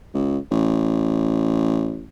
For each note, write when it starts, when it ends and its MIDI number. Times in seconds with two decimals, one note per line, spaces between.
0.14 0.38 37
0.51 2.07 33